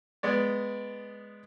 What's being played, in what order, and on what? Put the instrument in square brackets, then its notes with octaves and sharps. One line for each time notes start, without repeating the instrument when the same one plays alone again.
[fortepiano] G#3 B3 D5